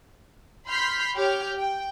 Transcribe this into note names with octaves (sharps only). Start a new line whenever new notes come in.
B5 C6 F6 G6 B6 C7
G4 C#5 F6 G6
G5